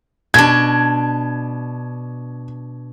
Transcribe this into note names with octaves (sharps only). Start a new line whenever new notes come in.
B2 D4 G#6